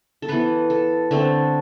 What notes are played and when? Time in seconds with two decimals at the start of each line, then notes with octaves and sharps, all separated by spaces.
0.22 A4
0.28 E3 B3 B4
0.70 A4
1.11 D3 A3 C4 A4